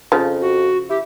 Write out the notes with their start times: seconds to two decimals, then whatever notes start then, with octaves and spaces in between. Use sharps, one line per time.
0.12 F2 C#3 F3
0.41 F#4
0.90 E4 G4